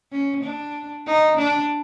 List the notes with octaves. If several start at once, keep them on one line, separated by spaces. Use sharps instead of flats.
C#4
D4
D#4
D4